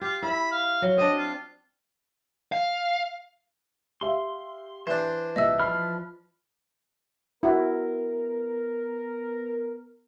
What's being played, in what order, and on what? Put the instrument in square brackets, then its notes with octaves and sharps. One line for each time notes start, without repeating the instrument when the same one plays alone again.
[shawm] F4 [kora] G4
[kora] E4 E5 [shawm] B5
[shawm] F5
[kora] F#3
[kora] C4 D4 [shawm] D#5
[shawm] F4
[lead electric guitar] F5
[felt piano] G4 E5 F5 [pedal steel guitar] C6
[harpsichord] E3 D4 [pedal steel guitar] C5
[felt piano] C2 A#2 [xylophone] D#5 E5 E6
[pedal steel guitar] F3 F6 [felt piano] B5 C7
[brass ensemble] B3 A#4 [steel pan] E4 F#4